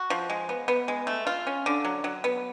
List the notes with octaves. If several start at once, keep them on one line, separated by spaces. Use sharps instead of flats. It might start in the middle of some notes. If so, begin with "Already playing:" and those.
Already playing: F#4
F3
G#3
B3
B3
G#3
A3
F4
C#4
D3
F#3
F#3
B3